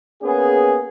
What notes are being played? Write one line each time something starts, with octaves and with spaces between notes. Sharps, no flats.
A#3 B3 C#4 G#4